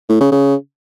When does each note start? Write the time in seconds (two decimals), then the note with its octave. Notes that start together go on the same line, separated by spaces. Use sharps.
0.09 A2
0.21 C#3
0.32 C#3